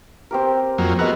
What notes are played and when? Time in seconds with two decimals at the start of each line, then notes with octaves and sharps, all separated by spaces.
0.31 C4 G4 A#4
0.78 F2 F#3 A#3
0.99 G#3 B3 F#4 A#4 E6